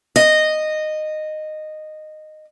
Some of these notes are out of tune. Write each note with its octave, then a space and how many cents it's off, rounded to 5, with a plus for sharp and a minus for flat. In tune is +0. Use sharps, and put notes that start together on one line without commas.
D#5 -10